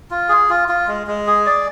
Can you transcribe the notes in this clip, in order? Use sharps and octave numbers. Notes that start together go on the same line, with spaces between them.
F4
G#4
F4
F4
G#3
G#3
G#4
D5